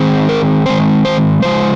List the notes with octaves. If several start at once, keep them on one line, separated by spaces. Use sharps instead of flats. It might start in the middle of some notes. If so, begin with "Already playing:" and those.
Already playing: D#3 G#3 C4
A#4
D#3 G#3 C4 C5
C5
C#3 F3 G#3 C5